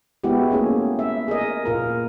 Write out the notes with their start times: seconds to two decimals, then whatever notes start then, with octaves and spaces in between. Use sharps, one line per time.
0.24 G#3 B3 E4 F#4 G4
0.51 A3 A#3 C#4 G#4
0.99 E5
1.28 G#4 A#4 D#5
1.65 A#2 F4 A#4